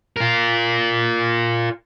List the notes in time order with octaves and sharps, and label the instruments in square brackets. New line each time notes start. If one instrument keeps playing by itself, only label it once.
[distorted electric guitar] F4 A#4